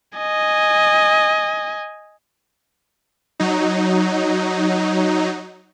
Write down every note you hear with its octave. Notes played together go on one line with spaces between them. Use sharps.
D#5 G#5
F#3 D#4